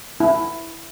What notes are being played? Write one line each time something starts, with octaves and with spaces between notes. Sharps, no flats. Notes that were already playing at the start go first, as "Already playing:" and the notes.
E4